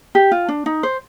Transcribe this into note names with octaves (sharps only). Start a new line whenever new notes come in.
G4
F4
D4
D#4
C5